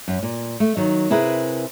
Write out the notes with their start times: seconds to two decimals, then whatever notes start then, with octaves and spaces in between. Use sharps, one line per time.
0.08 F#2
0.23 A#2
0.60 A3
0.77 D#3 F#3
1.10 C3 E4 G#4 A#4 B4